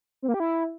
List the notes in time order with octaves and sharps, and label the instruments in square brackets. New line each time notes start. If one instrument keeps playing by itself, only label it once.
[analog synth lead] C4
A#3
G4
E4